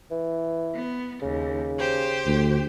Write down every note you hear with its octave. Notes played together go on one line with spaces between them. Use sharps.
E3
B3
D#2 C#3
G4 C5
D2